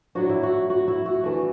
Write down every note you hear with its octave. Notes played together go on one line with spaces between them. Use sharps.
A2 F#3 D4 F#4
E4
F#4
F#4
E4
F#4
E3 A3 D4 F#4